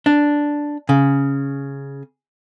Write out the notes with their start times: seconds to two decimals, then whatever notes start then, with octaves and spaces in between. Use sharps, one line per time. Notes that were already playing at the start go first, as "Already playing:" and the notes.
0.06 D4
0.89 C#3